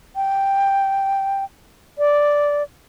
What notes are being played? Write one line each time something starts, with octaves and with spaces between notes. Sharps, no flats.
G5
D5